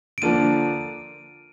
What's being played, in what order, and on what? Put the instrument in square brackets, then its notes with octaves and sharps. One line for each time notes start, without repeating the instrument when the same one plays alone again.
[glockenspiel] D7
[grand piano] D3 F3 A#3 D4 F4 [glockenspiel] D#7